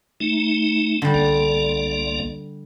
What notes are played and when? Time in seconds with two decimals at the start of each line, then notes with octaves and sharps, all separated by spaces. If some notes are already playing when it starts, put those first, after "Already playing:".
0.20 A3 D#4
1.02 D3 G3
1.14 C2 A#3 D5